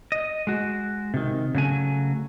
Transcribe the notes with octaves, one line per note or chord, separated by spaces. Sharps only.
D#5
G#3 F#4
C3 D#3
C#3 F#3 A3 G#5